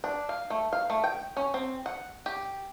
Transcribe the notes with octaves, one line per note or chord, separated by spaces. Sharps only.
D4
F5
A3
F5
A3
G5
C#4
C4
F#5
G4